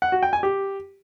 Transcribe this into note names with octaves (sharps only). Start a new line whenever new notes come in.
F#5
F#4
G5
G#5
G4